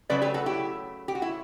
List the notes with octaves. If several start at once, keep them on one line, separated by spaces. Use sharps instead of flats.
C#3 F#3 A3 B4 D5
G4 B4
F#4 A4
E4 G4
G4
F#4
E4